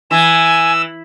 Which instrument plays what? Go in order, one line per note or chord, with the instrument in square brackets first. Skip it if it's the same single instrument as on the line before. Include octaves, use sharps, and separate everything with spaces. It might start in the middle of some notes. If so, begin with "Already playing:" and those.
[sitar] E3 [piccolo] G#5 [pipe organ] E6